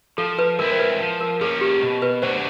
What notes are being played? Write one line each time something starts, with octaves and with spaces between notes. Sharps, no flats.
F3 A4
B4
G#3 C4 E4 A#4
C5
B4
F3
A#4
A#3 C#4 G#4
G4
B2
B4
F#3 A3 D4 F#4 C5